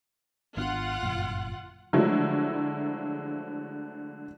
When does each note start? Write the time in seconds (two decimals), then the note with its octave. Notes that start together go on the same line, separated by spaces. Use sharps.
0.57 G#1 B3 D4 F4 F#5
1.03 G1 F#2 A#2
1.93 D3 F3 F#3 G#3 A3 E4